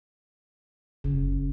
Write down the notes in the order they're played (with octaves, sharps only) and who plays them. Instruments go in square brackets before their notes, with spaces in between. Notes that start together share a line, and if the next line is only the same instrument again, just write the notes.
[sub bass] F#1 [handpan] C#3